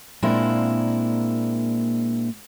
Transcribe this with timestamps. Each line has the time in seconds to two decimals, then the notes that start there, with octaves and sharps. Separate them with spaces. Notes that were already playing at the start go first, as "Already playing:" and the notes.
0.22 A#2 G#3 A#3 C4 D4 E4